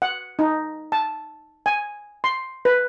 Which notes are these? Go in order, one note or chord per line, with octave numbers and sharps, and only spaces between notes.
F#5
D#4
A5
G#5
C6
B4